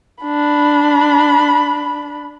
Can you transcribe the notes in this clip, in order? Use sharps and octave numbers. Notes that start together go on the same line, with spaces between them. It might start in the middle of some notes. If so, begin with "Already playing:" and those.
D4 B5